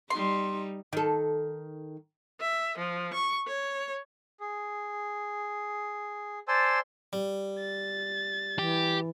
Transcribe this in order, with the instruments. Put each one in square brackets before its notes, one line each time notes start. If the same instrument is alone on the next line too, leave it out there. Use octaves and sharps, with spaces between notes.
[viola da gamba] G3 D#4 [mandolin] C6
[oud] D#3 A4
[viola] E5
F3
C#6
C#5
[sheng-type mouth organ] G#4
C5 D5 G#5 A5 C6 E6
[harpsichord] G3
[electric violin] A6
[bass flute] E3 [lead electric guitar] G4